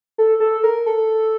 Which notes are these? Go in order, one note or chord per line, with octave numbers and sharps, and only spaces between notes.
A4
A4
A#4
A4